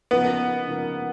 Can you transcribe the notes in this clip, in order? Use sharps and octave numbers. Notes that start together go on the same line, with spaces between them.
C#3 F3 A#3 B3 D#4 A#4
C#3 F3 A#3 D#4 A#4